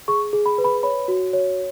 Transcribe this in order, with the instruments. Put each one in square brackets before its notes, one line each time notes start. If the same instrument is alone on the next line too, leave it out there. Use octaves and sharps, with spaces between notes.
[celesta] G#4 C#6
G#4
B5
B4
B5
C#5 B5
F#4
C#5